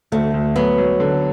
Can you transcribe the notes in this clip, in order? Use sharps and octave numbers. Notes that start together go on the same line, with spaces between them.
D2 A3
D2
F#3 B3
F#3
D3